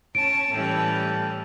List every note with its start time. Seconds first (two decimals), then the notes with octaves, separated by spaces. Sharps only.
0.15 C#4 C#5 A5 D7
0.52 A2 E3 G3 C#4 A4 G5 A5